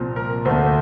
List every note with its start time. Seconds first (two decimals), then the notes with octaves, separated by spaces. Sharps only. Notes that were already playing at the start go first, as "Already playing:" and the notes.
Already playing: C2 A#2 F3 C4
0.16 A#4
0.45 D2 D3 A3 C4 C5